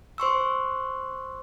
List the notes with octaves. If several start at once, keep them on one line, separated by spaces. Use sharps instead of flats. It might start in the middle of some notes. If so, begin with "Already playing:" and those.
C5 C6 C#6 E6